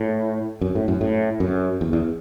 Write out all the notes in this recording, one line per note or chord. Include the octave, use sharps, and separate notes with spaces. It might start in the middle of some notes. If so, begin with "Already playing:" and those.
Already playing: A2
F#2
A2
F#2
A2
F#2
E2
E2